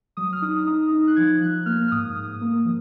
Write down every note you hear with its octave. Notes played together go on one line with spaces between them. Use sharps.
F#3 D#6
F6
D#4 D#6
D#4 D#6
D#4
F#6
F3 G#6
F3 F#6
A#3 F6
F6
G#2 D#6
G#2
A#3
F3